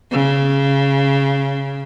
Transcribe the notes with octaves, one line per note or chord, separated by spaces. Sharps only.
C#3